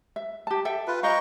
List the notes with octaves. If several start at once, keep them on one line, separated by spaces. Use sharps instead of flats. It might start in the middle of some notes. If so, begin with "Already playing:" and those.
E5
G4 A5
A4 E5 G5
F4 B4
C5 D#5 F5 G5 A#5 C#6